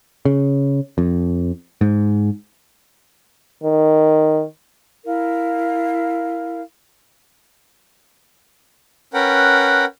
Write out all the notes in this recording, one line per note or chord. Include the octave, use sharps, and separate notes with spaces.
C#3
F2
G#2
D#3
E4 A#4 F5
C#4 A#4 B4 F#5 G5